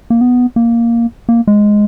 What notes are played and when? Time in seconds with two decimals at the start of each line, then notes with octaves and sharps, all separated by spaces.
0.10 A#3
0.21 B3
0.56 A#3
1.29 A#3
1.47 G#3